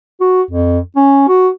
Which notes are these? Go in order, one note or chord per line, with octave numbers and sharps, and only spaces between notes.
F#4
F2
C#4
F#4